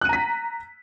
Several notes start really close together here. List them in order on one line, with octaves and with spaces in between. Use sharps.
F#6 D#7 A#5 B6